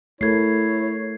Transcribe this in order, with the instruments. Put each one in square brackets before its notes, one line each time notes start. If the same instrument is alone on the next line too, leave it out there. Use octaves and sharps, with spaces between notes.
[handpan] A3 A4 A#4 [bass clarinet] E4 [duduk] C#5 [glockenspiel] G#6 C7